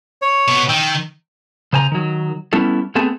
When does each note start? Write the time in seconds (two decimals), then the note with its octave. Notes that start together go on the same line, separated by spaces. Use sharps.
0.22 C#5
0.48 B2 B3
0.69 D#3 G5 E6
1.73 C#3 C5 G#5 A#5
1.92 D#3 F#3
2.53 G3 B3 C#4 E4 A4
2.95 A3 B3 C4 G#4 A4